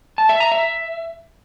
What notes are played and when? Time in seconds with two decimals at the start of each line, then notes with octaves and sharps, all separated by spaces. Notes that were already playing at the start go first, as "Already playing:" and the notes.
0.18 A5
0.29 E5
0.40 A#5
0.52 E5